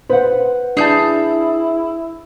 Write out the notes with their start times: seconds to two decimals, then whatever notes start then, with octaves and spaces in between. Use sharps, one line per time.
0.10 B4 C5 F#5
0.77 D4 E4 G#4 A5 G6